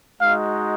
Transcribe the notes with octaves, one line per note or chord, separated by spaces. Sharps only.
G#3 D#4 F#4 F5